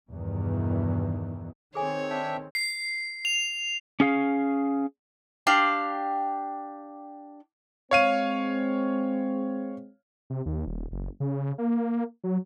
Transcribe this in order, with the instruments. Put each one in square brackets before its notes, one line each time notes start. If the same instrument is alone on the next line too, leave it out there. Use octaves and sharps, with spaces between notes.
[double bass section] E2 G2 B2 D#3 E3
[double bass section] D#3 C4 [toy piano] G#4 A4 G#5 [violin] C#5
[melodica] D4 E5 G5
[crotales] C7
F7
[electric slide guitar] C#4 G#4 F5
[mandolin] D4 G4 F5
[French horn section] G#3 C4 [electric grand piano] C#5 F5 D#7
[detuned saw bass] C3
D#2
D#1
F#1
C#3
A#3
F#3